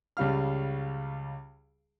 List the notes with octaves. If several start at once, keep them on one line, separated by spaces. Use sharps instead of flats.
C#2 C#3 G3 F5 F6